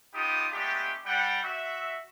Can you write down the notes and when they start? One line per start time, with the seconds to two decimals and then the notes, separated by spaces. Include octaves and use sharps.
0.15 B3 D#4 F4 G4 D6 D#6
0.52 G#3 A3 B3 D4 G4
1.06 G3 F#5 G5
1.43 F#4 E5